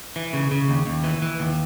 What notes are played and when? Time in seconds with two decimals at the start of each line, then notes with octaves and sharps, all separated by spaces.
0.16 E3
0.33 C#3
0.51 C#3
0.69 D#2
0.86 D#2
1.04 E3
1.22 E3
1.40 D#2